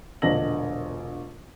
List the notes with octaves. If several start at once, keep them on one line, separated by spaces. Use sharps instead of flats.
E1 A#1 D3 D#5 A#6 F#7